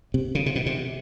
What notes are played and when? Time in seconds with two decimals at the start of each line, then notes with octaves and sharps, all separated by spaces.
0.14 C3
0.35 C#3
0.46 C3
0.56 B2
0.66 C3